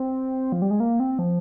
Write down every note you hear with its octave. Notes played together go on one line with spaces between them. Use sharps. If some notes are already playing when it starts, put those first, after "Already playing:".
Already playing: C4
F3
G3
G#3
A#3
C4
F3